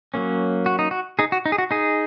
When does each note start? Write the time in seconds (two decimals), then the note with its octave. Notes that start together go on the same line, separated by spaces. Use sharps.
0.14 F#3 A#3 C#4
0.66 F#4
0.79 D#4
0.91 F#4
1.19 D#4 G#4
1.32 F#4
1.46 D#4
1.52 G#4
1.58 F#4
1.71 D#4 G#4